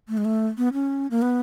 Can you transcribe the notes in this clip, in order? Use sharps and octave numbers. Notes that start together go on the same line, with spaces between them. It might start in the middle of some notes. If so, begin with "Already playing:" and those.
A3
G#3
A3
B3
C#4
A#3
B3